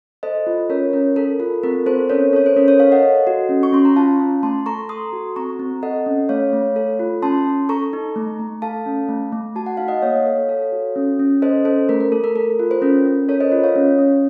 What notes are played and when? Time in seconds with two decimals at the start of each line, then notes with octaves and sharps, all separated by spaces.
0.23 A4 C5 D#5
0.47 F4
0.70 C#4 A#4 C#5
0.93 C#4 A#4
1.16 A4 A#4
1.40 F4 A4
1.63 C4 A#4
1.86 C4 A4 C5
2.09 C#4 A#4 C#5
2.33 A4 C#5
2.46 C5
2.56 C#4 A#4
2.68 A#4 C#5
2.79 A4 C#5 F5
2.92 D#5 F#5
3.03 A4
3.27 F#4
3.49 C#4
3.63 C#6
3.73 C#4 C6
3.85 A#5
3.96 F4 F5 A5
4.20 C#4
4.43 A3 A5 C6
4.66 A4 A#5 C#6
4.89 A4 C6 D#6
5.13 F#4
5.36 C4 A#5 C#6
5.59 C4
5.83 A4 D#5 F#5
6.06 C#4
6.29 A3 C#5 F5
6.53 A3
6.76 A4
6.99 F4
7.22 C#4 A5 C6
7.46 C#4
7.69 A4 A#5 C#6
7.93 D#4
8.16 A3
8.40 A3
8.62 A4 F5 A5
8.86 C#4
9.09 A3
9.32 A3
9.56 F#4 A5
9.66 F#5
9.77 D#4 F5
9.88 D#5 F#5
10.02 A#3 C#5 F5
10.26 A4
10.49 A4
10.72 F#4
10.96 C#4
11.19 C#4
11.42 A4 C5 D#5
11.65 C#4 A4 C5
11.89 A3 A#4
12.00 A#4
12.12 A3 A4
12.24 A#4
12.36 A4 A#4
12.59 F4
12.71 C5
12.82 C#4 A#4
13.06 C#4
13.29 A4 A#4 C#5
13.41 C5 D#5
13.52 F4
13.64 C#5 F5
13.75 C#4
13.99 C#4